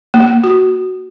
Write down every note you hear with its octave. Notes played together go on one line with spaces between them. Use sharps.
A#3
F#4